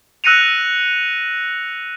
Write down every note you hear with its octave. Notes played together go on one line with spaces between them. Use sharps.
E6 F#6 A#6 C#7 D#7 F7